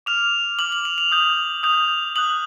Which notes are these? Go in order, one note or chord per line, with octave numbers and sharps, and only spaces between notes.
D6 F6 F7
D6 F6 F#7
F#7
F7
F7
D#6 G6
D#6 G6 F7
D#6 F#6 F#7